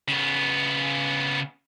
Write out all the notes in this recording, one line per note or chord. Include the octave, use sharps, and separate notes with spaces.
C#3 B3